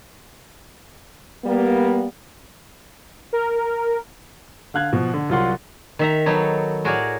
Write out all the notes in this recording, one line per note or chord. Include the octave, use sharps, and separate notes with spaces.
G3 A#3 B3
A#4
D3 F5 F#6 G#6
B2 F3
D3
C2 F#3 F4 F#5 C6
D#3 E5 A#5
F#3 B3 D#4 A4 C#5
A2 F#4 G#4 A#4 C#5 D5